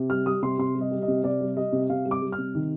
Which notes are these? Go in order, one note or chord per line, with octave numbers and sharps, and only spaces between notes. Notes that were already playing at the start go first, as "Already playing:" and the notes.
Already playing: C3
G3 F6
G3 D#6
C3 C6
C3 C6
G3
D#5
G3
D#5
C3
C3 D5
G3
G3 D#5
C3
C3 F5
G3
D6
G3
F6
C3
D#3